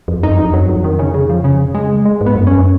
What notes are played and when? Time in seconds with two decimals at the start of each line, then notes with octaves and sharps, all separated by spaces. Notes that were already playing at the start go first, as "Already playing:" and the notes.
0.08 F2
0.23 F#2 D#4
0.39 F2
0.53 F#2 F#3
0.69 F2
0.84 D#3
0.99 C#3
1.14 C#3
1.29 F3
1.44 C#3
1.74 G#3
2.05 G#3
2.21 G#2
2.26 B3
2.35 F#2
2.47 F#2 C#4